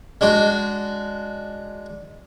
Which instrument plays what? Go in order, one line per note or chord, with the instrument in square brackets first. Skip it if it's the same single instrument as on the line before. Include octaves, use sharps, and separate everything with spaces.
[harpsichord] G#3 D4 F#4